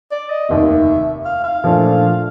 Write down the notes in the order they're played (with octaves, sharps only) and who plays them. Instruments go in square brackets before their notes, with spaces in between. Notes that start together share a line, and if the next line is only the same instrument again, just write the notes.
[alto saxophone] D5
D#5
[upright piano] F1 D#2 D#3 [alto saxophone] E5
[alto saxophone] F5
F5
[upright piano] A#2 F3 A3 D4 F4